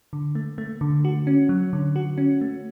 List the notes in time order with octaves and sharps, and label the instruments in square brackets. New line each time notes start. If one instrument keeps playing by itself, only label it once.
[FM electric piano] D3
A3
A3
D3
F#4
C#4
F#3
D3
F#4
C#4
A3